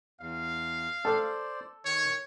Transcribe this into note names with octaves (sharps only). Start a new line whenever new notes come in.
E2 F5
A4 C5 D5
D#3 C#5